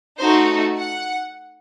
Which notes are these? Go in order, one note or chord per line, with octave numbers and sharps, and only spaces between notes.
A3 D#4 F#4 C5
F#5